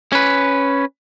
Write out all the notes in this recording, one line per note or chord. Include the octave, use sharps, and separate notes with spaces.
C#4 B4